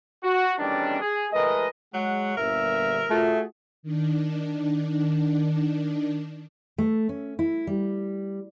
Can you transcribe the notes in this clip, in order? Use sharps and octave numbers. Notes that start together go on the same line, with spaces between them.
F#4
E2 A2 D#3 G3 C#4 D4
G#4
F3 G#3 A3 A#4 B4 D#5
F#3 G#3 F#5
G1 A#2 A#4 E5
A3 F4 F#4 G#4
D#3 D4
A3
C#4
E4
G3